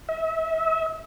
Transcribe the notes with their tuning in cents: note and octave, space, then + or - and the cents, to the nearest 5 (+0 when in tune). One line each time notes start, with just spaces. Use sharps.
E5 -35